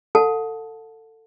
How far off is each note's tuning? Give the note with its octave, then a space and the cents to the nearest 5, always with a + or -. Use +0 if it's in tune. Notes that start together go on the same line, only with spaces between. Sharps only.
A4 +20 F#5 -40 A5 -10